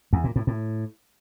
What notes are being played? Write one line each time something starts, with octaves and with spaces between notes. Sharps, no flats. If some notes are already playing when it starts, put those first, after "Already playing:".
E2
A#2
A2
A2